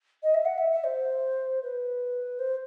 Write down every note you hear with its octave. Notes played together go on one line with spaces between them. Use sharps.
D#5
E5
F#5
E5
E5
C5
B4
C5